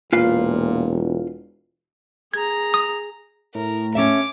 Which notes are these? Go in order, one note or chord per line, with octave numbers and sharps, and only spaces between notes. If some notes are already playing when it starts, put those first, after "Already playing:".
E1 A#2 F4 B4 F5
G#4 A#5 G#6
D#6
A2 A#4
C#4 A4 E5 D6